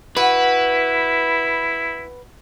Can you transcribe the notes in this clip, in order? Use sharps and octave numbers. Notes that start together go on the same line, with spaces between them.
E4 F#4 B4